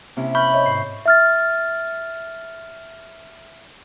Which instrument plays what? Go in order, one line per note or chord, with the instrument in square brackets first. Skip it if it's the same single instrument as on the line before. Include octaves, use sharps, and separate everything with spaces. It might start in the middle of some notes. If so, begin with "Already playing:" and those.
[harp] C3 C#4 E4 [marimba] A#3
[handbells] B5 [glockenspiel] C#6 G6 [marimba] F6
[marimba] C#5 D#5 E5
[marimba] G#2 [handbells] C7
[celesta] E5 F6 A6